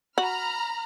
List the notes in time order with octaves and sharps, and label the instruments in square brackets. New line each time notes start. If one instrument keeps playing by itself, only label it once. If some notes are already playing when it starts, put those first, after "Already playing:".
[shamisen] F#4 [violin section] A#5 B5 F6